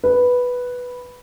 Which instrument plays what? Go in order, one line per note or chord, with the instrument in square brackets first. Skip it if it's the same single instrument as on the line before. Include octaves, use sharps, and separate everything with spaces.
[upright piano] B4